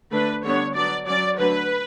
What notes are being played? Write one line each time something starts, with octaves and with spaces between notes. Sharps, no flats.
D3 A3 D4 B4
D3 G3 B3 D4 C#5
F#3 B3 D4 D5
F#3 C#4 D5
D3 F#3 A3 D4 B4